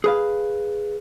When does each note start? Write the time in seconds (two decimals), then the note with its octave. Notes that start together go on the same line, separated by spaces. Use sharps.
0.04 G#4 B4 F5